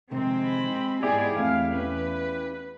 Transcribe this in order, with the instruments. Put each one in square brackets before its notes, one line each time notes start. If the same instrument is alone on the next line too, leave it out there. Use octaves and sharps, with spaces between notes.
[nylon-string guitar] F2 C3 D#3 [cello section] G#3 C4
[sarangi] B5
[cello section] G#2 G#4 [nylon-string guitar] B3 [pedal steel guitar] E4 G4 [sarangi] D5
[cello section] E2 [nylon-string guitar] D3 A3 C4 [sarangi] F5
[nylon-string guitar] C#4 [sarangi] B4